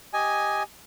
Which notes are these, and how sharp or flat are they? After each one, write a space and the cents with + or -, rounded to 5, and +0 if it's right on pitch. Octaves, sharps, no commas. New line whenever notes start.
G4 +0 D#5 +5 G#5 +0